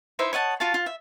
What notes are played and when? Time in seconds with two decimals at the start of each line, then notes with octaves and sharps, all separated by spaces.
0.19 D#4 E4 C5 E5
0.33 C#5 D#5 F#5 A5
0.60 F4 F#4 F5 A5
0.74 F4
0.86 E5